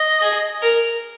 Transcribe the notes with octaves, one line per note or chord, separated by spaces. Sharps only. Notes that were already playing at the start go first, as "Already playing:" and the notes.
Already playing: D#5
G#4
A#4